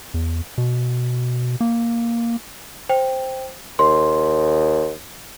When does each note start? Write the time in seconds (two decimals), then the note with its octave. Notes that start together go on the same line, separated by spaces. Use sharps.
0.14 E2
0.58 B2
1.61 A#3
2.89 C5 G5
3.79 D#2 C6